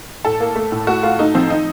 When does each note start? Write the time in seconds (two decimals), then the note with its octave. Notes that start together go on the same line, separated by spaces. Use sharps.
0.25 A2 A4
0.40 A#3
0.56 A3
0.72 A2
0.87 A3 F#4
1.03 A3 F4
1.19 A3 D#4
1.35 F3 C4
1.50 D#4